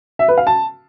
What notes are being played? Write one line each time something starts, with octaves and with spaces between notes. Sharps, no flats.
E5
B4
F5
A5